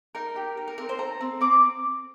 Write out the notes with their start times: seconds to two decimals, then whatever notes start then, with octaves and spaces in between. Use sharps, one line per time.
0.15 D#4 A#4
0.36 G4
0.57 D#4
0.68 A#4
0.78 C4 A#4
0.89 C5
0.99 A4 A#5
1.21 C4
1.41 C4 D6